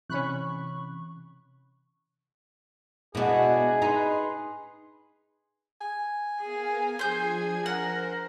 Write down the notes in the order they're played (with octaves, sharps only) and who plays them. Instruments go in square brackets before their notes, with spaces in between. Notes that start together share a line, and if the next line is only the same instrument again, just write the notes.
[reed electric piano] C3 E3 [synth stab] C#4 B5 F#6 [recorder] C#6
[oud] B2 B3 [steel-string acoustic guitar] G#3 E4 [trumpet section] D4 F#4 [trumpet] G#4
[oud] D#4 [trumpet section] B4 C6
[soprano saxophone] G#5
[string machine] B3 A#4 F5 [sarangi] G#4
[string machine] F3 D4 G#6 [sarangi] G#4 [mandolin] C5 G6
[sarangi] A#4 [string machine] C5 [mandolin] F#5